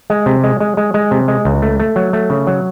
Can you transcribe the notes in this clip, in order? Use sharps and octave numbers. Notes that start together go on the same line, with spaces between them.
G#3
C3
G#3
G#3
G#3
G#3
C3
G#3
C#2
A3
A3
F#3
A3
C#3
F#3